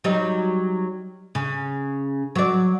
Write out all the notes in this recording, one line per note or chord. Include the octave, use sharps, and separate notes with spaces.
F#3 G3 D#4
C#3
F#3 D5